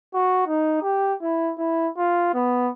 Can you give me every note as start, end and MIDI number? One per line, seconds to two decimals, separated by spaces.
0.15 0.47 66
0.48 0.79 63
0.82 1.14 67
1.22 1.52 64
1.58 1.88 64
1.98 2.31 65
2.34 2.69 59